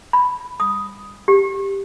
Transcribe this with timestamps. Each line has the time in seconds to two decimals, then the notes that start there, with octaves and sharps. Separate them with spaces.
0.13 B5
0.60 D#6
1.28 G4